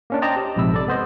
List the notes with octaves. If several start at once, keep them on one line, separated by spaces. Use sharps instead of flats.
A#3 C#4 D4
C5 D5 D#5 G5 A5 A#5
G4
A#1 G#2 C3 B5 E6
A4 D5
B3 C5 D#5